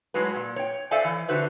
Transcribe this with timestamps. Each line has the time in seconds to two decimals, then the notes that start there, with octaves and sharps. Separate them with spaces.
0.14 A2 F#3 G#3 F#4 B4
0.36 A#2
0.56 C#5 G5
0.91 A4 C5 D5 E5 F5 G#5
1.05 E3
1.28 D3 F#4 B4 C5 E5